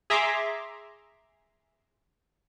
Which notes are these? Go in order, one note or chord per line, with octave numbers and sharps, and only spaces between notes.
G#4 E5 A#5 C6 D6